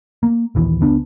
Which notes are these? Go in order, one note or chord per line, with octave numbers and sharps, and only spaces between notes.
A#3
A#1 D#2 E3
C#2 B3 D4